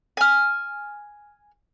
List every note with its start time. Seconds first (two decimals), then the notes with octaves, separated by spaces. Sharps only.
0.17 G#5 F6